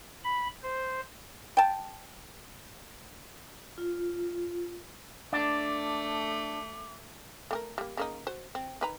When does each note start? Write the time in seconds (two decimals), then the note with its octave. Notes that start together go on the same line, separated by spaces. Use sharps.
0.24 B5
0.63 C5
1.57 G5 A5
3.78 F4
5.33 A3 D4 D6
7.51 A3 G4 A#4
7.78 G3 A#3
7.97 C#3 A#3 D#4
8.27 F#4 C5
8.55 C4
8.81 D#3 B4 A#5